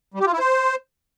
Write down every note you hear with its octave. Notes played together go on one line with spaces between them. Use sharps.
G3
G4
F4
E4
C5